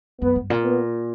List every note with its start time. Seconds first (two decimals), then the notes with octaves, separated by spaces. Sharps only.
0.21 F#2 B3
0.36 G2
0.50 A#2
0.65 B3